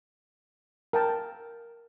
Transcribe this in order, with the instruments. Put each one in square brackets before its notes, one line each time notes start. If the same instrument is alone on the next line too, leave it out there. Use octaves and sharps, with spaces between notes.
[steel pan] A#4 G5 A5